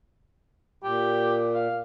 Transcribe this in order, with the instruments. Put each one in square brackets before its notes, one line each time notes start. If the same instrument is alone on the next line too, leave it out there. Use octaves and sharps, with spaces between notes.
[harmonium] A#2 [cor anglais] G4
[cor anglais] F5